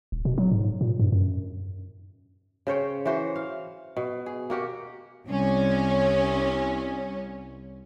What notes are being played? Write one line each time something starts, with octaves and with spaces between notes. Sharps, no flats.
D#1
B2
F#3
G#2
A#2
G2
F#2
C#3 C5 C#5 G5
E3 F#4 C5
F5
B2
G#4
A#3 F#4 G4
C2 C#4